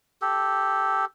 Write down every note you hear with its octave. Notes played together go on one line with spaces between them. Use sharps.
G4 A4